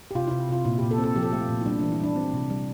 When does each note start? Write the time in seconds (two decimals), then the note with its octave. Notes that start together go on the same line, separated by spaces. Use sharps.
0.11 G4
0.15 C3 F4
0.27 C3 E4
0.49 C3 F4
0.65 A#2 E4
0.78 A#2 G4
0.91 A4
0.98 C4
1.04 A4
1.16 F3 G4
1.23 A4
1.31 A3 G4
1.41 F4
1.49 A#2
1.61 E4
1.66 G3 D4
1.79 E3 D4
1.92 E4
2.00 G3 D4
2.16 C4
2.34 C3
2.50 G3